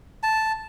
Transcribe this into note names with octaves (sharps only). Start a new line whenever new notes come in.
A5